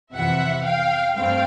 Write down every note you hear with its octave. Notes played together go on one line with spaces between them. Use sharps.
F2 C3 E3 E5 F#5
F5 G5
G2 A3 C4 F5 G5